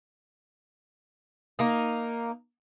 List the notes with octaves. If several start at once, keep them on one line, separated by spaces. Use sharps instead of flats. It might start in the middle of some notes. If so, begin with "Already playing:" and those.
A#3 D#4